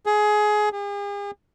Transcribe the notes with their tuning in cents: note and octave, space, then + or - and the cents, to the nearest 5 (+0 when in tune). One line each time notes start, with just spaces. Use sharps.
G#4 +20
G#4 -45